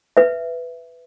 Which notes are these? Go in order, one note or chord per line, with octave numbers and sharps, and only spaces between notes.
B4 E5